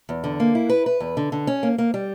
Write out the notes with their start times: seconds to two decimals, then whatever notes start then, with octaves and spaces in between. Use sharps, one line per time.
0.09 E2
0.24 D3
0.40 A#3
0.55 E4
0.69 B4
0.86 B4
1.00 E2
1.17 D3
1.32 D3
1.47 C#4
1.63 A#3
1.78 A#3
1.94 G3